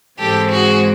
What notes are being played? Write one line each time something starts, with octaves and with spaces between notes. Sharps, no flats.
G#2 E3 G#3 C4 G4 A4
F#4 G#4